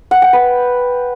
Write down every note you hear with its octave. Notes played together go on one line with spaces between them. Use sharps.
F#5
G5
B4